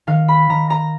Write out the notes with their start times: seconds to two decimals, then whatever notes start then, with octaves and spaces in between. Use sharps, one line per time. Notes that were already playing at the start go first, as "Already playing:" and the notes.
0.07 D#3 F5
0.28 B5
0.50 D#3 A#5
0.70 A#5